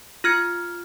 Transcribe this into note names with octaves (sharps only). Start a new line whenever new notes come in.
F4 F6 G#6 C#7